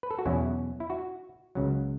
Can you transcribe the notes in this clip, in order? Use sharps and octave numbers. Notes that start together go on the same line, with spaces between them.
B4
A4
F#4
E2 B2 F#3 C#4 E4
E4
F#4
C#2 C#3 F#3